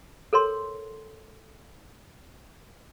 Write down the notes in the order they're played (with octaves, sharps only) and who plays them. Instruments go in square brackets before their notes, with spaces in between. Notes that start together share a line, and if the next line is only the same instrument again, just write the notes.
[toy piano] A4 A#4 C#5 C6